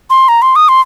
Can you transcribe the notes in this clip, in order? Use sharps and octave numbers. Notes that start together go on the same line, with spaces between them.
C6
A#5
C6
D#6
C6